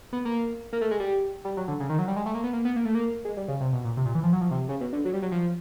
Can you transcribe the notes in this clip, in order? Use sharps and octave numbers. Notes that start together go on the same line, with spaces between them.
B3
A#3
A#3
A3
G#3
G3
G3
F#3
D3
C#3
D#3
F#3
G3
G#3
A3
A#3
B3
A#3
B3
A#3
A3
A#3
G#3
G3
C#3
C3
B2
A#2
C3
A#2
E3
F3
F#3
F3
C3
C#3
B2
D3
F#3
G3
F#3
F3